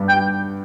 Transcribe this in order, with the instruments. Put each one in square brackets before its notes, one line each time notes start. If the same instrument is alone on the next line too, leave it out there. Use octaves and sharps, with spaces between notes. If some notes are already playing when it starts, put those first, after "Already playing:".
Already playing: [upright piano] G2 G3 B3
[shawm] G5
[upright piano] G3